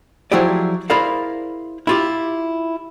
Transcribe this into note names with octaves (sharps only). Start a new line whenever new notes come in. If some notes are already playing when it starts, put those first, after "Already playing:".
F3 F#3 E4 G4 G#4 D5
E4 G#4 A#4 C5 D5 F5
E4 F4 G4